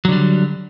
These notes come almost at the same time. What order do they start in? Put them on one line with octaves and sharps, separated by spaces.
F#3 D3 G3